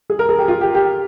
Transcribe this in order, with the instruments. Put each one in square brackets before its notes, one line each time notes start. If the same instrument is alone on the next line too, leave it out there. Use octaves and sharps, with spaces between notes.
[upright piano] G#4
A#4
G#4
G4
F4
G4
G4